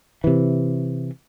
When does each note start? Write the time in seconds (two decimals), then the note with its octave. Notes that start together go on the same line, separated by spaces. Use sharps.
0.24 C3 E3